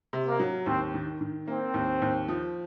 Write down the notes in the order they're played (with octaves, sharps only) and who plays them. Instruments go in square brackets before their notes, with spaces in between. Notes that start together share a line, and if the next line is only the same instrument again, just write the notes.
[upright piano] C3
[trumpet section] A#3
[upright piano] F#3
[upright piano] D#2 [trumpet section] C4
[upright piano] D#3
D#3
[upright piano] A#3 [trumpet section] C4
[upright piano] D#2
D#2
F3